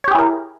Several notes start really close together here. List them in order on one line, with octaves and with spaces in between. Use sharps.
C#5 G4 G#4 E4 A#4